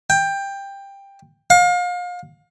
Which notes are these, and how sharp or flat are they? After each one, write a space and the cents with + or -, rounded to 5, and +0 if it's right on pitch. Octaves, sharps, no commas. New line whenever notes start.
G5 +15
F5 +35